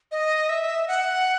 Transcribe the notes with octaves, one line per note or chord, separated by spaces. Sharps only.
D#5
E5
F#5